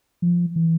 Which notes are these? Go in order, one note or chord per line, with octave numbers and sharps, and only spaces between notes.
F3
E3